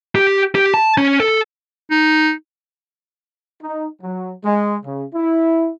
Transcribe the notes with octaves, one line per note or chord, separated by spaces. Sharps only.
G4
G4
A5
C#4
A4
D#4
D#4
F#3
G#3
C#3
E4